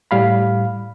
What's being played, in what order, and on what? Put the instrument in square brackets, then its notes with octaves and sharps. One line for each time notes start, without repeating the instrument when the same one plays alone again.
[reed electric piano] A2 G3 F5 B5